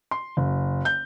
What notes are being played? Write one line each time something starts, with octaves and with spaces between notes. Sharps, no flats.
C6
F#1
G6